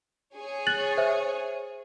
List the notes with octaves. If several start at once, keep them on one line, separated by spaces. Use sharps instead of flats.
G#4 C#5 G#5
F#6 A6 F#7
C5 E5